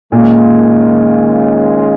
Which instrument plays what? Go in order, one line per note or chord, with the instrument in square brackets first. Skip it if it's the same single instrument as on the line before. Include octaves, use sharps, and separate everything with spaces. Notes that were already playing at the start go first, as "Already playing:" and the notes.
[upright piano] A#2 [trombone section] D#3 G#3 C#4 F4